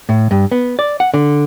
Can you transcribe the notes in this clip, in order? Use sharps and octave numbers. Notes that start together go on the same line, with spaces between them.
A2
G2
B3
D5
F#5
D3